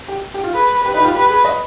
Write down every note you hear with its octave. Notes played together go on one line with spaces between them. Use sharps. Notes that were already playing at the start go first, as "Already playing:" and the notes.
G4
G4
F4
G#4 B4
G4 B4
D#4
G4
F4
G4 B4
G#4
D#5